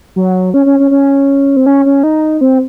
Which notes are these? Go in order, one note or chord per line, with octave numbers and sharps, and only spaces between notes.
F#3
C#4
C#4
C#4
C#4
C4
C#4
C#4
D#4
C4